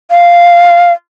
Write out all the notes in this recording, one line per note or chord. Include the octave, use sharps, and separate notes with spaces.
F5